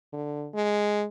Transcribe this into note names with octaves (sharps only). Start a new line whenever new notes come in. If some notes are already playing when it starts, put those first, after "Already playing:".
D3
G#3